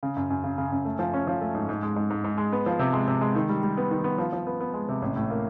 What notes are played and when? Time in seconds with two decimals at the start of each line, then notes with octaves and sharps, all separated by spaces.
0.03 C#3
0.16 F#2
0.30 F#2
0.44 C#3
0.58 C#3
0.72 F#2
0.85 A3
0.99 F3
1.13 C#4
1.27 F3
1.41 A3
1.55 G#2
1.69 G#2
1.82 G#3
1.96 G#2
2.10 G#2
2.24 G#2
2.37 G#3
2.53 B3
2.66 F3
2.79 C3
2.93 G#3
3.08 C3
3.21 G#3
3.35 D#3
3.49 G3
3.63 G3
3.77 B3
3.91 D#3
4.04 B3
4.18 F3
4.33 F3
4.47 B3
4.61 B3
4.73 G#3
4.88 C3
5.02 A1
5.16 A2
5.30 A#3